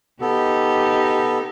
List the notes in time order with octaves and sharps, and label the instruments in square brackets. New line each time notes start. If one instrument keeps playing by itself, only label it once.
[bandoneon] B3 A4 [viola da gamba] D#4 G4